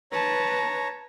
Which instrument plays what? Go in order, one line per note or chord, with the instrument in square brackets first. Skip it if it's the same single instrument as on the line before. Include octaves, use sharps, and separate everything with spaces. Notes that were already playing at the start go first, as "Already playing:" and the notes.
[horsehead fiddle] B4 A5 [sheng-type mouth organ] C#5 A#5